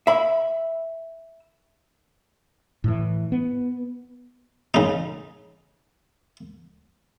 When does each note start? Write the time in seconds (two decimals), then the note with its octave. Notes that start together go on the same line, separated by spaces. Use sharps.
0.07 E5 B5
2.84 A2 E3
3.32 B3
4.74 C#3 D#4